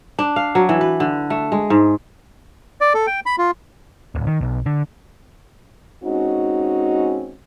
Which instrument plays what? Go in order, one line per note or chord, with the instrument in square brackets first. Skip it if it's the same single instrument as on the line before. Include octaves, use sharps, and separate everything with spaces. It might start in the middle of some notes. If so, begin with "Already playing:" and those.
[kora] D4
F5
F#3
E3
B4
D3
A3
G#3
G#2
[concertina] D5
A4
G5
B5
F4
[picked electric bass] D1
D#3
B1
D3
[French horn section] G#3 C4 C#4 D#4 F#4